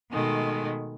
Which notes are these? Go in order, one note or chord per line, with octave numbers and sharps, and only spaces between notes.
B2 D#3 G#3 A3